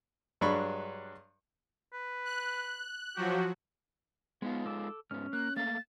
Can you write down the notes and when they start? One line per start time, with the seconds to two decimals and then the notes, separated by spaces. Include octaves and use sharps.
0.41 G2 F#3 G#3 D4 B5 C#6
1.93 B4
2.25 F#6
3.16 F3 F#3 F#4 G4
4.42 G#3 B3 D#4 F4
4.66 A4 D6 E6
5.11 G#2 B3 C#4 F6
5.33 A#3 F#6
5.56 A3 A#3 F5 A6